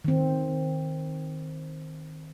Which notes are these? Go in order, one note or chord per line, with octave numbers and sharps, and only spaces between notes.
D#3 C4